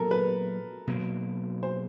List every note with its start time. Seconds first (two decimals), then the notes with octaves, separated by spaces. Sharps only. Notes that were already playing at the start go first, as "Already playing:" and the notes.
Already playing: A#2 F#3 B3 A4 A#4
0.11 B4
0.87 B2 F#3 A#3
1.63 C5